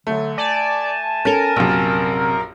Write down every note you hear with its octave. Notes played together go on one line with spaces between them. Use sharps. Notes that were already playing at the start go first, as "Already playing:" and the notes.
D3 F#3 A3
D5 G#5 A5
C#4 A4 A#4
A#1 F#2 C3